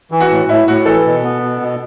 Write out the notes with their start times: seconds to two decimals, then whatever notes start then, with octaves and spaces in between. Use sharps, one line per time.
0.12 E3
0.20 F#4
0.30 A2
0.48 A2 E4
0.68 A2 F#4
0.86 E3 A4
1.05 B2
1.24 B3
1.42 B2
1.61 B2